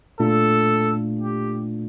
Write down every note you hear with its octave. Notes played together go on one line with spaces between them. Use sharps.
A#2 A3 D4 F4 A4
G4